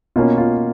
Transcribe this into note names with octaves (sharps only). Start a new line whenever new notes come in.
B2 A#3 C#4 F4
F4